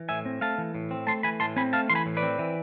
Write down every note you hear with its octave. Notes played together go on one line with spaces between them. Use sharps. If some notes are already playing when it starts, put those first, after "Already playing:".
Already playing: E3
A2 E5 G#5
C4
A3 F5 A5
E3
A2
C4
A3 A5 C6
E3 G#5 B5
A2 A5 C6
C4 G#5 B5
A3 F5 A5
E3 C6
G#5 B5
A2
B4 D5
C4
E3